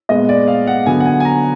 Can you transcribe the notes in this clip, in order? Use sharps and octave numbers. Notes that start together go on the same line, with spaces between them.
A#2 G#3 B3 D#5
D5
F5
F#5
D3 F#3 B3 G#5
F#5
G#5
G#5
A#5